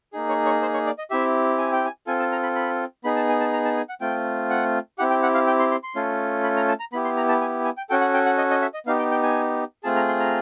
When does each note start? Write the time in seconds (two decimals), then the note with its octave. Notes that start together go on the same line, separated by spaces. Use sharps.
0.13 A#3 D#4 G#4
0.29 C#5
0.45 C#5
0.62 C5
0.74 C#5
0.86 D5
0.98 D#5
1.10 C4 E4 G4 E5
1.58 G#5
1.72 G5
1.85 G#5
2.07 C4 F4 A4 G#5
2.20 A5
2.32 A#5
2.43 B5
2.56 B5
3.04 B3 D#4 G#4 B5
3.16 A5
3.29 G#5
3.40 A5
3.53 A#5
3.65 A5
3.77 G#5
3.89 F#5
4.01 A3 C4 F4 G5
4.50 F#5
4.98 C4 E4 G4 F#5
5.10 G5
5.23 F#5
5.34 F5
5.47 G5
5.59 C6
5.71 C6
5.83 C6
5.96 A3 C#4 F4 A4
6.44 B5
6.56 A#5
6.69 A5
6.80 A#5
6.93 B3 E4 G4 B5
7.05 C6
7.17 A#5
7.29 A5
7.41 G#5
7.65 G#5
7.77 G5
7.90 C#4 F#4 A4 G5
8.01 F#5
8.14 G5
8.26 F#5
8.38 D#5
8.51 D#5
8.62 E5
8.74 D#5
8.86 B3 D#4 G4 F5
8.99 G5
9.11 G5
9.23 G#5
9.83 A3 C4 F4 G#4 A5
9.96 A#5
10.08 C6
10.20 A#5